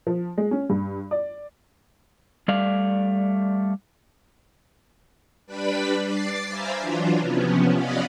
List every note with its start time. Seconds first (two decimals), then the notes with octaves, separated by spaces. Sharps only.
0.07 F3
0.38 G#3
0.51 C#4
0.70 G2
1.11 D5
2.48 G3 A3 D5 F5
5.47 G3 D4 B4 D5 B5 B6
6.03 D6 A6 C7
6.48 C5 E5 F5 G#5 A#5 B5
6.80 E3 F#3 D4 F4
7.20 C3 F3 B3 C#4
7.74 C#4 D5 D#5 F5 F#5 B5